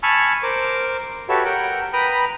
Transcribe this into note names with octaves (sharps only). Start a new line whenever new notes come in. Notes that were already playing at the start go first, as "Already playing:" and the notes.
G#5 A5 B5 C#6 E6 F6
A#4 C5 D6
F#4 G4 A4 B4 C#5 E5
A#4 F#5 G5
B4 G5 A#5 B5 D#6